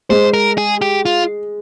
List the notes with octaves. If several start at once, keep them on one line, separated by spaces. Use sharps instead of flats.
G#3 C5
A#4
G#4
G4
F4